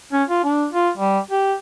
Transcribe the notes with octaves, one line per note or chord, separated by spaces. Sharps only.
C#4
F4
D4
F4
G3
G4